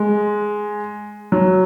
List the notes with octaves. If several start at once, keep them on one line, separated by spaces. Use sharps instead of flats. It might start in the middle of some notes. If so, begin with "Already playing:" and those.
Already playing: G#3
F#3